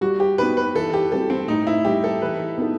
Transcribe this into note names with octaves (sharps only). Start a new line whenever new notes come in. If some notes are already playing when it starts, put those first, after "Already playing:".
G3 F#4
G4
B3 D#4 F#4 B4
B4
E3 A4
G4
G3 C4 D#4 F#4 A4
C4
A2 D#4
E4
G3 D#4 G4
A4
E3 B4
B3 D#4 A4